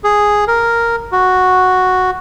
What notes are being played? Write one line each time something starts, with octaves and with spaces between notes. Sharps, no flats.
G#4
A#4
F#4